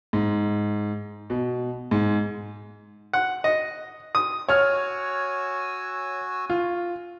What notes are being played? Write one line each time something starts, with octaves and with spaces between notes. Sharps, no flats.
G#2
B2
G#2
F#5
D#5
D#6
F#4 C#5 G#5 E6 F6
F4